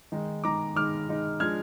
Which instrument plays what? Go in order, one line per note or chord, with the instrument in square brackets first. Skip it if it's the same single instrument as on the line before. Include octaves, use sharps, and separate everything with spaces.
[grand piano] D#3 G#3 D#4
D#3 G#3 D#4 A#5 D6
D#3 G#3 D#4 D6 F6
D#3 G#3 D#4
F3 G#3 D4 F6 G#6